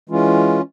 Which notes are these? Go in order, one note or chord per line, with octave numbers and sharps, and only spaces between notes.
E3 G#3 C#4 F4